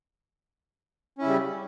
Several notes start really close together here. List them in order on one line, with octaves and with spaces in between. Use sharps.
C#4 E4 C#3 G3